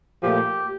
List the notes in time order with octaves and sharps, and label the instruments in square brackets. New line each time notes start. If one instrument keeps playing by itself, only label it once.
[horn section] A#2 F3 A3 G4